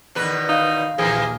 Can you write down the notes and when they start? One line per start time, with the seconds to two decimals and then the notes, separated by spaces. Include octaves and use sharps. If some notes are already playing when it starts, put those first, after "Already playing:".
0.15 E2 B2 D#3 B4
0.49 D#4 F5
0.98 A#1 D#2 E3 A#3 C4 G#4